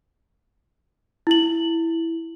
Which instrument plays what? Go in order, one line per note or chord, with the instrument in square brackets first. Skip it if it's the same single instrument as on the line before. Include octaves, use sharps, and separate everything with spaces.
[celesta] E4 F#7